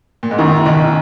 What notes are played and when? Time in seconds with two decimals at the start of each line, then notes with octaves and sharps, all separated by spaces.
0.23 A#2
0.31 G#2
0.38 F#2 D#3
0.65 B1 B2 D#3